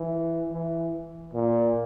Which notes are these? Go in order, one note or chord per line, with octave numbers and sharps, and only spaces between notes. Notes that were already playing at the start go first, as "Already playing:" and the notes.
Already playing: E3
E3
A#2